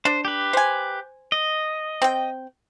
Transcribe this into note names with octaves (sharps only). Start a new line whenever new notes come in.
D4 C5
G4 B4
C5 G#5
D#5
C4 G5